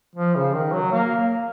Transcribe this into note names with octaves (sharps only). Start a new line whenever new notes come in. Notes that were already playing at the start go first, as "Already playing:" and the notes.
F3
C#3
D#3
F#3
A#3